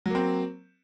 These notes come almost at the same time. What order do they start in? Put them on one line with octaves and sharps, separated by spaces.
F#3 A#3 C4